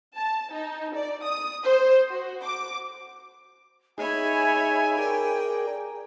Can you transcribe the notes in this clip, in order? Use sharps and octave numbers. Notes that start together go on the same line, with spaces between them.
A5
D#4
D5
D#6
C5
F#4
D6
D#4 G#4 C#5 E5 G#5 B5
G#4 A#4 D5 G5